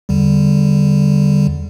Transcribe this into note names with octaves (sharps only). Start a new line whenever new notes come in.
E2 D3 G3